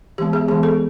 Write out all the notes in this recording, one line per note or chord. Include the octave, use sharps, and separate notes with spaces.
E3 G#3 B3 G4
G#4
E3 G#3 B3 G#4
A4